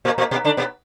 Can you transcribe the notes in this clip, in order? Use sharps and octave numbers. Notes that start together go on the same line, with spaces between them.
A#2 A#3
A#2 A#3
B2 B3
D3 D4
B2 B3